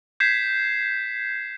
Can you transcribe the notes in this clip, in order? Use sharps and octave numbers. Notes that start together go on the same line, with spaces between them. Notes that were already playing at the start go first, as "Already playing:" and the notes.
G6 G#6 B6 C7 E7